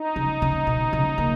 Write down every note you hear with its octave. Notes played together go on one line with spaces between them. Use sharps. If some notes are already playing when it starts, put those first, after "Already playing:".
Already playing: D#4
C#3
C#3
B2
C#3
A#3